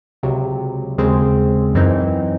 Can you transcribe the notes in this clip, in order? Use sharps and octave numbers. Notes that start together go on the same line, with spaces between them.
C#2 C3 F#3
D#2 C#3 G#3 C4
F#2 E3 C4 D#4